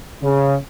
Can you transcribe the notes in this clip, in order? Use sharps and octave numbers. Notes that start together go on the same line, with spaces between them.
C#3